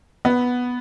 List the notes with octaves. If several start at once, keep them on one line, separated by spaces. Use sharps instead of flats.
B3